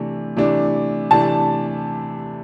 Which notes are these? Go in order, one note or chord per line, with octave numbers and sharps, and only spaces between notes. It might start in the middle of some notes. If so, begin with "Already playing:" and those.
Already playing: C3 E3 A3 D4
C3 E3 A3 D4
C3 E3 A3 D4 A5